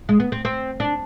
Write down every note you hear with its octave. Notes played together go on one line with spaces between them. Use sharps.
G#3
B3
C4
C4
D4